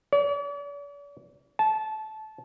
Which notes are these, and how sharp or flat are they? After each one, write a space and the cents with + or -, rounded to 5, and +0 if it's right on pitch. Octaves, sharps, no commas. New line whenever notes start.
D5 -45
A5 -20